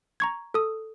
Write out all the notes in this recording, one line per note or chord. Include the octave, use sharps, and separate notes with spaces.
A#5 C#6 G#6
A4 D#6